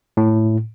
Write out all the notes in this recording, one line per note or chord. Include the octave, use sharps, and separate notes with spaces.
A2